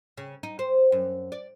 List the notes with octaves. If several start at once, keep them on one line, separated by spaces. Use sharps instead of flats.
C#3
D#4
C5
F#2
D5